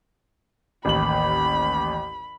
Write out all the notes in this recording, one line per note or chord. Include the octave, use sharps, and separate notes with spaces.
A1 D#2 B5 F#7